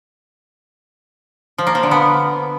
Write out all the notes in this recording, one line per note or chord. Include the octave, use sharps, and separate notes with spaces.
F3
A#3
F3
D3
B3